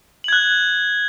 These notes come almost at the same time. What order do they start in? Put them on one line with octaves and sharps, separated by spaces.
F#7 G#6 F#6